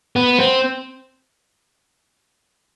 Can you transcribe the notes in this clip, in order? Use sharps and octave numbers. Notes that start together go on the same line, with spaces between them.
B3
C4